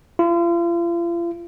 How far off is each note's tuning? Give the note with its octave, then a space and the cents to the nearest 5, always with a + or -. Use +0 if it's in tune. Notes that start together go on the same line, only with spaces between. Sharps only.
F4 -40